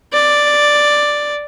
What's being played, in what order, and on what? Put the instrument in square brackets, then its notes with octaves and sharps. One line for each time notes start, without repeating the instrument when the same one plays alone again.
[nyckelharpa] D5